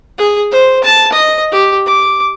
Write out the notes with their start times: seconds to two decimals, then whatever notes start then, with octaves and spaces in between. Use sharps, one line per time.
0.18 G#4
0.52 C5
0.84 A5
1.13 D#5
1.52 G4
1.86 D6